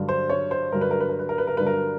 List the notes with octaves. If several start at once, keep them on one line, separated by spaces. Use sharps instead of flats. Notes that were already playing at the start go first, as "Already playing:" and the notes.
Already playing: G2 D3 F#3
C5
C#5
C5
G2 D3 F#3 A#4
B4
A#4
B4
A#4
B4
A#4
B4
A#4
G2 D3 F#3 B4
A#4